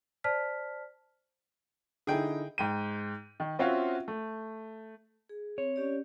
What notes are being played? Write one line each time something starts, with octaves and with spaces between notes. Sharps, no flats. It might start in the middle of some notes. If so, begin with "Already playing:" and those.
C5 D5 A5 F6 B6
D3 D#4 E4 G#4 G5
G#2 G5 D#7
D#3
C4 C#4 F4 F#4 E5 F5
A3
G#4
C4 C#5
C#4 G4 D5